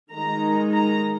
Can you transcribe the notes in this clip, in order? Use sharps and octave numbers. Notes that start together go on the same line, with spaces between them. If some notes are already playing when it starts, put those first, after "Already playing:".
D#3 G#3 D#4 A#5
A#5